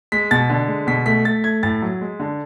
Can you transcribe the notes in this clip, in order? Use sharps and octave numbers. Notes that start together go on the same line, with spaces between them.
G#3 B6
B2 A6
D3
G#3
B2 B6
A3 B6
A3 A6
A3 G#6
A2 A6
F#3
G#3
D3